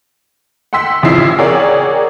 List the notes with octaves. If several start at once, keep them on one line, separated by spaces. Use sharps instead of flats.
F#5 G5 C6 E6 B6
A1 C#3 F3 E4 C7
G#4 A#4 C#5 D5 F#5 G5